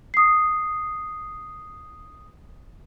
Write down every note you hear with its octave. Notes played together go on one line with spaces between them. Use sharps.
D#6 C7